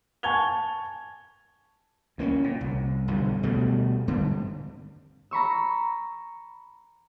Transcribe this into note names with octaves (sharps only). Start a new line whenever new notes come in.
G#5 A5 C#6 G#6 F7 G7
D2 A#3 C4 C#4
A#2
C2
B1 G2 D3 F3
D2 B2 G3 A3
G2 D3 G3 C4
A#5 B5 C#6 E6